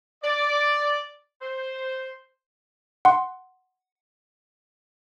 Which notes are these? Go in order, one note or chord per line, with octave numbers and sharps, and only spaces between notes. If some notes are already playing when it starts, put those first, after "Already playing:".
D5
C5
F#5 C6